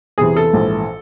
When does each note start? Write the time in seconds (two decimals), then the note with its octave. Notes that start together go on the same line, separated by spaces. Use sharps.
0.18 E2 C3 E3 G#4
0.37 A4
0.53 A#1 G#2 E3